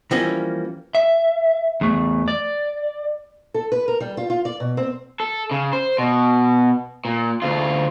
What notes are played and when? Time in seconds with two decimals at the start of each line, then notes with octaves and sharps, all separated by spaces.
0.11 E3 F3 G3 A#3 C#4
0.95 E5
1.81 E2 A3
2.28 D5
3.54 A4
3.72 B4
3.88 A#4
4.00 G3
4.17 F4
4.30 F4
4.45 D5
4.60 B2
4.77 C4
5.20 A4
5.51 C#3
5.73 C5
5.98 B2
7.05 A#2
7.42 D2 F4